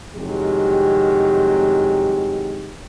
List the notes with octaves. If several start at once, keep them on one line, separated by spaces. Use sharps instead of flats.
C2 F2 D#3 F#3 G#3 G4